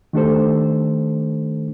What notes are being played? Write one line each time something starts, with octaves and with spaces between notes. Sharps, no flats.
D#3 A3 D4 G4 A4 C5